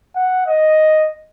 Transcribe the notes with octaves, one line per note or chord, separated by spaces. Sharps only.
F#5
D#5